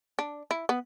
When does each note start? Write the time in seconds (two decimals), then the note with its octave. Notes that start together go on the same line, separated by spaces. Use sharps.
0.19 D4
0.51 E4
0.69 B3